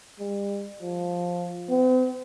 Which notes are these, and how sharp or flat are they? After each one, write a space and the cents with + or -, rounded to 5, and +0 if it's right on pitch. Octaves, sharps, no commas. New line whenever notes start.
G3 +40
F3 +10
C4 -40